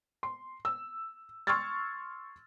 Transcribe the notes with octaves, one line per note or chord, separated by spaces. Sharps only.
C6
E6
C6 C#6 E6 F6 G#6 A6